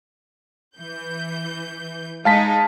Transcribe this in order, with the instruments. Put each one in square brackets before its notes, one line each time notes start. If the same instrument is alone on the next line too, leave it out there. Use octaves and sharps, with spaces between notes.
[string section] E3 G6
[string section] G#3 D#4 [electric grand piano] F5 A5 B6